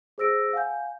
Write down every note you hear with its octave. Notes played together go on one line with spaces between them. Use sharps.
G#4 C5 E6 A#6 D7
F5 F#5 G#5 G6